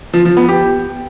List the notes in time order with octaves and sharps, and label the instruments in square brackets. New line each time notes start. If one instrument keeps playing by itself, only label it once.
[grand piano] F3
F3
B3
G4